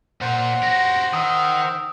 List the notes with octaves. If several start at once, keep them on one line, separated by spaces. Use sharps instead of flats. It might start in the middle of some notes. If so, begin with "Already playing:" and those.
A#2 C5 F#5
F#4 G4 A#6
D#3 D#6 E6